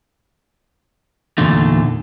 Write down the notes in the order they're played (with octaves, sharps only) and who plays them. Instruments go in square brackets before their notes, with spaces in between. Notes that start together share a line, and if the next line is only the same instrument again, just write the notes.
[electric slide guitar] E2 A#2 D3 D#3 A3